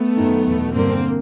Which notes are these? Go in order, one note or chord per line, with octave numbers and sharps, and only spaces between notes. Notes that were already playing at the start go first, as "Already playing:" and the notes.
Already playing: A3 B3
F#2 D#3
E2 B2
G2 D3 A#3 C4